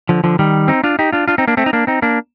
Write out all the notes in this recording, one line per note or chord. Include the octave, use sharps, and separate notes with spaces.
D3 F3
D3 F3
D#3 G3
C4 D#4
D4 F4
D#4 G4
D4 F4
D4 F4
C4 D#4
A#3 D4
A3 C4
D#4
A#3 D4
C4 D#4
A#3 D4